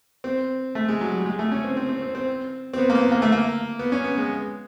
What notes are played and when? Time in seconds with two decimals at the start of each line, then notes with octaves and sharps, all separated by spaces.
0.24 C4
0.75 A3
0.88 G#3
1.01 F#3
1.13 G3
1.26 G#3
1.39 A3
1.52 C#4
1.64 C4
1.77 C4
1.89 C4
2.02 C4
2.15 C4
2.74 C4
2.78 B3
2.90 A#3
2.95 B3
3.12 A#3
3.22 A3
3.32 A#3
3.79 B3
3.92 C#4
4.04 B3
4.18 G#3